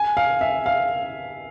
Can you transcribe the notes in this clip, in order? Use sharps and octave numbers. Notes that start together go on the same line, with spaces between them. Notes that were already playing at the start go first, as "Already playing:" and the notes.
Already playing: G#5
F5
E5
F5